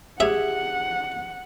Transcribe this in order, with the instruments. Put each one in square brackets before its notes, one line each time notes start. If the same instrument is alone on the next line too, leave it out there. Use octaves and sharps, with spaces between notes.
[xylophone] G4 G#4 G#6 [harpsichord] E5 [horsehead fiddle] F#5